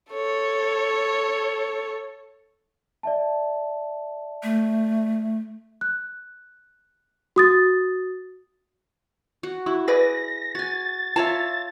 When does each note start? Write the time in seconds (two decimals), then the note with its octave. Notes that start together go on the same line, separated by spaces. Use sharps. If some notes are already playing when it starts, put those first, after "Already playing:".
0.12 A4 C#5
3.03 D5 E5 A5
4.43 A3
5.81 F#6
7.36 F#4 D#6 A6
9.43 F#4
9.66 E4 F#4
9.88 G#4 B4 D5 A#6
10.55 F#4 G#5 A6
11.16 F4 C#5 E5 A5